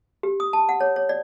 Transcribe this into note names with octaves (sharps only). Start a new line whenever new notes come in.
G4
D#6
A5
F#5
C#5
C#5
D5